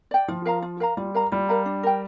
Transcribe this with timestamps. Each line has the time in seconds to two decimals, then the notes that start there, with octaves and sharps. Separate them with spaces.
0.11 D5 G5
0.28 F3 F4
0.45 A#4 F5 A#5
0.62 F4
0.80 A#4 F5 A#5
0.97 G3 F4
1.14 A#4 F5 A#5
1.32 G3 F4
1.49 A#4 F5 A#5
1.66 D4
1.83 A#4 G5